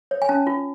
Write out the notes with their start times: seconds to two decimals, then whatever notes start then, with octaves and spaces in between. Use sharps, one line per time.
0.11 C#5
0.22 G#5
0.29 C#4 A5
0.47 F4